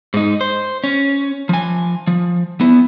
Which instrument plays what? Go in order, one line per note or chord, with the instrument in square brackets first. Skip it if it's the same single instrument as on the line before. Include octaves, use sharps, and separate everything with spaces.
[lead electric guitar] G#2 D#4
C5
C#4
F3 G#5
F3
B3 E4